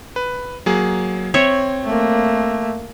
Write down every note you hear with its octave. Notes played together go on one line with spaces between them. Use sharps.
B4
F#3 A#3 G#4
C4 C#5 E5
A3 A#3